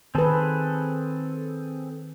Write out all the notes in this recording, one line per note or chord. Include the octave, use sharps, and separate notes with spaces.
D#3 C4 G#4 A4 B4